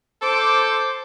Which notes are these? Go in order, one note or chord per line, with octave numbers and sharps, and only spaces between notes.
A4 C5 D6